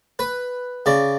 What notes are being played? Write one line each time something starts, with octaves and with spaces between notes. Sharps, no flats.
B4
C#3 D5